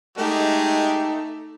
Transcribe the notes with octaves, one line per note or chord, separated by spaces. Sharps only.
G#3 A3 D#4 G4